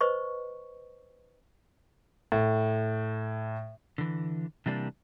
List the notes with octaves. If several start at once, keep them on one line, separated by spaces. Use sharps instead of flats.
B4 C5 D#5 C#6
A2
D3 E3
C3 E3 G3 A#3 D4